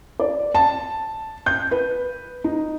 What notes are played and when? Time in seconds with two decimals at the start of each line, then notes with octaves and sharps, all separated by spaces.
0.20 D5
0.55 A5
1.46 G6
1.71 B4
2.44 D#4